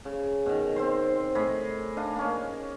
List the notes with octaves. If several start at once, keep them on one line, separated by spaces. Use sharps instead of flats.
C#3
B2 D#3
C4 C5 C6
A2 G#4 D#5 B5
D4 D#5 F5
A#3 C#4